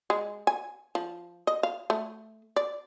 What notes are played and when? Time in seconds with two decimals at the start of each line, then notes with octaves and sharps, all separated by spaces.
0.10 G#3
0.47 G#5
0.95 F3
1.47 D#5
1.63 F5
1.90 A3
2.56 D5